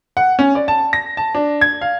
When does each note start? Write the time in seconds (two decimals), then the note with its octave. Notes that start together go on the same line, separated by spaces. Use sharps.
0.17 F#5
0.39 C#4
0.55 D5
0.68 A5
0.93 A#6
1.17 A5
1.35 D4
1.61 G#6
1.81 F5